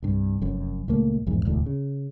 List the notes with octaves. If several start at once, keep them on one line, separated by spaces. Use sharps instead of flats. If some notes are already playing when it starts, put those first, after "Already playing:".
C2 G2
F1 F#2
C#2 A#2 A3 A#3
A#1 E2 G#2
E1 D2 A2
C#3